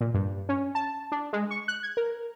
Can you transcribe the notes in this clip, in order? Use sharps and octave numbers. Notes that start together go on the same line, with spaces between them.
A#2
G2
C#4
A5
D4
G#3
C#6
F#6
G#6
A#4